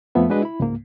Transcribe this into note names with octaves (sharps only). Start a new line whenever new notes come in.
F2 F3 A3 B3 E5
G#3 D4 F#4 G#4 B4 D#5
E4 B5
C#2 G#2 A#3